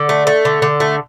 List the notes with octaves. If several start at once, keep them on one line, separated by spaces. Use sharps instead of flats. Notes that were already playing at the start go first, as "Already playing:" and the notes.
Already playing: D3
A3
A3
D3
D3
A3